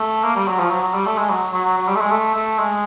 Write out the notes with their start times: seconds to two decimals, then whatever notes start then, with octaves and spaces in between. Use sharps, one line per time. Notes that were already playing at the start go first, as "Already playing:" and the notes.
Already playing: A3
0.24 A#3
0.35 G3
0.48 F#3
0.59 F3
0.71 F#3
0.83 F#3
0.94 G3
1.06 A3
1.18 G#3
1.29 F#3
1.53 F#3
1.64 F#3
1.77 F#3
1.88 G3
1.95 A3
2.00 G#3
2.11 A3
2.35 A3
2.58 G#3